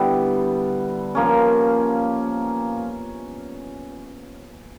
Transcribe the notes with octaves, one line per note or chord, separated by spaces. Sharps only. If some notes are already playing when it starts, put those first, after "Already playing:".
Already playing: D3 G3 B3 E4
F3 A#3 C#4